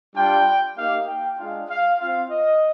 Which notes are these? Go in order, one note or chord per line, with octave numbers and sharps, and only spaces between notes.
G3 D4 F4 G5
A#3 D#4 G4 F5
G5
G#3 D4 F4 F5
F5
C4 F4 F5
D#5